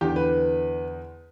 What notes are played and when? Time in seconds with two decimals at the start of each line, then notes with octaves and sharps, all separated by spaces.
0.01 E2 D3 G4
0.16 B4